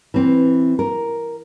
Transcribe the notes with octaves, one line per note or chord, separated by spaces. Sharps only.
E3 C4
A#4